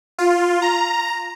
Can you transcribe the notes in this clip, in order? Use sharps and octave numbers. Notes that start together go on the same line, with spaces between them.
F4
A#5